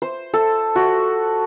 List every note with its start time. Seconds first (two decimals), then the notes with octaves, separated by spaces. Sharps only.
0.02 C5
0.34 A4
0.76 F#4